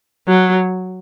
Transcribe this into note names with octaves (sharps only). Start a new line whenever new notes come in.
F#3